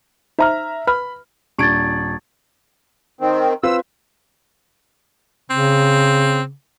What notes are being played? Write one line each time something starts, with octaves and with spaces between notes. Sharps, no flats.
D#4 C5 E5 A#5 F6
B4 B5 F6
D#1 D4 C#6 G#6 A6 D7
D#3 C4
C4 F4 B4 E6
C#3 C4